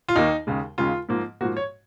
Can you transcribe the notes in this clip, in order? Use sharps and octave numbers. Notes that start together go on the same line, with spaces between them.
F4
D#2 D#3 A#3 D#4
D#2 C#3 G#3
D#2 C#3 G#3 F4
G#2 F3 A#3
G#2 F3 A#3 F#4
C#5